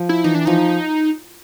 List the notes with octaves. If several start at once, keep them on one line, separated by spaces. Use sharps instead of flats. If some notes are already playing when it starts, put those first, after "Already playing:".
Already playing: F3
E4
E3 D#4
D4
F3 D#4